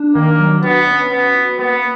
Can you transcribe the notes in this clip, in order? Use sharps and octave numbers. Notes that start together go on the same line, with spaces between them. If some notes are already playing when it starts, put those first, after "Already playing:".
Already playing: D4
D#3 A#3
F#3
B3 F#4
C#4
B3 C#4
F#4
A#3 B3